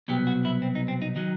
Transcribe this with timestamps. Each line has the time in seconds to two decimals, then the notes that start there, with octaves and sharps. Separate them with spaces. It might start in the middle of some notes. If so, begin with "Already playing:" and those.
0.08 C2 B2 F#3 B3 G4
0.27 F#4
0.45 E4
0.62 C4
0.75 D#4
0.88 C4
1.02 D#4
1.16 D#3 F#3 D#4